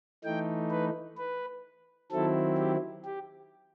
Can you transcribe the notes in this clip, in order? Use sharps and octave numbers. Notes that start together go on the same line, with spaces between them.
E3 A3 D#4 G5
B4
B4
D#3 F#3 C4 E4 A4
G4
G4